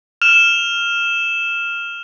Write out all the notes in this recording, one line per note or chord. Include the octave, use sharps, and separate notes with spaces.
F6 E7 F7